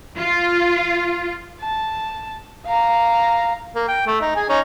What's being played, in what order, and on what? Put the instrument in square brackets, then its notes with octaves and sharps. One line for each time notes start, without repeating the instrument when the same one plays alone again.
[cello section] F4
[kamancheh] A5
F5 A#5
[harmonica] A#3
G5
A3
D#4
G#4 G#5
C#4 D#4